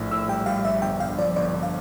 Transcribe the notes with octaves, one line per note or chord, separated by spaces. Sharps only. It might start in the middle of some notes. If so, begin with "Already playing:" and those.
Already playing: A#1 A2
A2 E6
G3 G5
G3 F5
A#1 E5
G1 G5
G1 F5
F3 D5
G1 D5
G1
F5